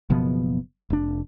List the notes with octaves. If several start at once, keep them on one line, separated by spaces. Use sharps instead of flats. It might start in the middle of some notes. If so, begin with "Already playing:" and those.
F#1 B2 F3 B3
F1 D4